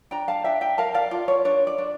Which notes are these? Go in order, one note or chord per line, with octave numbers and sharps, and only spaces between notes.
D4 G5 A#5
F5 A5
D4 E5 G5
E5 G5
A#4 F5 A5
D5 F5
F4 D5
C#5
D4 C#5
D5
D4